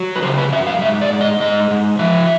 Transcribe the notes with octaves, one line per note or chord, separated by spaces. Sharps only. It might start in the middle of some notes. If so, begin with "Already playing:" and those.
Already playing: F#3
B4
C#3 C5
B4
F#2 E5
F5
G#2 E5
D5
G#2
D#5
G#2 D#5
G#2
F3 E5